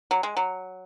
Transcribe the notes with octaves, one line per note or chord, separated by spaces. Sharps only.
F#3
G#3
F#3